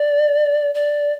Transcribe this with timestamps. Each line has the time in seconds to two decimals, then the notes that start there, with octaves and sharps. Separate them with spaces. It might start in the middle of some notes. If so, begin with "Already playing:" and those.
Already playing: D5
0.75 D5